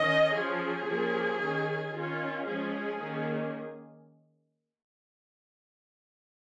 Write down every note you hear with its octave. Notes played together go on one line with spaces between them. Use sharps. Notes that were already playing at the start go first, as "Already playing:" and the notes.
Already playing: D#3 C#4 D#5
F3 C#4 G#4
F3 A#3 C#4
D#3 C#4
D#3 C#4 F4
F3 G#3 C#4 G#4
D#3 A#3 C#4